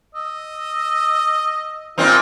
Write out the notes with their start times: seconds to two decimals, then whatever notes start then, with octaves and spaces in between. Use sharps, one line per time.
0.15 D#5 E6
1.98 A#2 C4 D#4 E4 G#4 F5